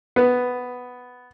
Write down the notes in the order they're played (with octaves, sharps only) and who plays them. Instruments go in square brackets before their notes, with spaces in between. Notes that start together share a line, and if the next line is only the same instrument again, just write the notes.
[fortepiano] B3